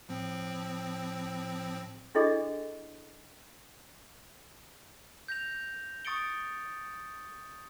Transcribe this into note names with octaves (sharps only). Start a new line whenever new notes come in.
A2 F3 C4
D4 E4 F#4 G#4 A4 D#5
G6 A#6 F7
C#6 D#6 A6 C#7 D7 G7